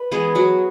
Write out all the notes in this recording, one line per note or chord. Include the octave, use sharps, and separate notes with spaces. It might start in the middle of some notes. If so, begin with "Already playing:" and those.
Already playing: B4
E3 G#3 B3 G#4
F#3 F#4